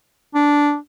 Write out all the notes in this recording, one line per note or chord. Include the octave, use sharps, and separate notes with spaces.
D4